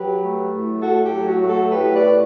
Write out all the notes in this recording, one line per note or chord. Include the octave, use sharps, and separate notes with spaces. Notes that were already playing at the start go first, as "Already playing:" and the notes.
Already playing: F#3 G4 B4
A3
A2
A2 F#4 A4
G4
F#3
F#4
A3
F#4 A4
A2 G4 B4
B4 D5
A2